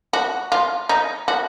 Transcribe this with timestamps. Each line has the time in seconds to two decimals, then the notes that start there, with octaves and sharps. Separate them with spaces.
0.13 F#4
0.52 F4
0.89 D#4
1.28 F#4